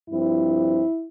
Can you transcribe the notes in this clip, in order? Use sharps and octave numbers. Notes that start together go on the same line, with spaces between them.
G2 F3 C4 E4